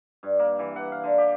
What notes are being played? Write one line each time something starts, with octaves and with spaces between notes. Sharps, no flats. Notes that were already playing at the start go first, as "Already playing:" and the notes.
G2
A#3
E3
F#5
F5
D3
G4